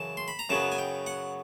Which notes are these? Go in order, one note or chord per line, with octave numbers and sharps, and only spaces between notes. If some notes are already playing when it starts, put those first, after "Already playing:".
Already playing: F#2 C#3 E3 A5
C6
B5
A#5
F#2 C#3 F#3 B3 A5
G#5
G5
F#5